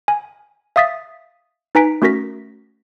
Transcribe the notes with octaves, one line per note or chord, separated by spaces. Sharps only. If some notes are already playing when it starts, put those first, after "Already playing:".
G#5
E5 F5 D#6 A6 B6
D#4 B4 G#5 A#5 B6 D7
A3 C#4 F#4 A#4 A#6 B6